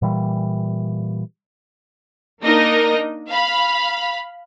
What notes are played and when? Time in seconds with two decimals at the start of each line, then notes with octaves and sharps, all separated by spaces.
0.02 A#2 E3 G3
2.42 A#3 D4 D#4 A#4 D#5 A#6
3.29 F5 B5